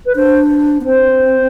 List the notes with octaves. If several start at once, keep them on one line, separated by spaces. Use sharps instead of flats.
B4
D4 C5
B3
C4 C5